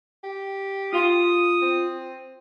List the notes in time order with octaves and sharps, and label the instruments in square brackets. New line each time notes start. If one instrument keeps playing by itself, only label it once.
[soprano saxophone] G4
[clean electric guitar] F4 F5 C6 [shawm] D#6
[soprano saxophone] C4